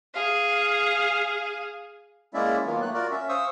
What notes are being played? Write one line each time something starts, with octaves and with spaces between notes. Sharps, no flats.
G#4 F5
G#3 A#3 C#4 E4 D5 E5
D#3 F#3 A#3 B3 F4
A3 A#3 F#6
F4 F#4 A#4 D5
C#4 E5
C5 F5 C#6 D#6 E6